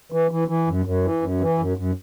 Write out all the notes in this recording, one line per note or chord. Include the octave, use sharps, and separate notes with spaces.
E3
E3
E3
F#2
F#2
E3
F#2
E3
F#2
F#2